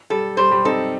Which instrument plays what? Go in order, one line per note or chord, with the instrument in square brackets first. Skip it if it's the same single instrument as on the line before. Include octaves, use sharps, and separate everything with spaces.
[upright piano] G3 [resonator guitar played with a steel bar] A4
[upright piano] G3 [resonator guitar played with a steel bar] C5
[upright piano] G3
[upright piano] C4 D#4 [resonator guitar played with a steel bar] A4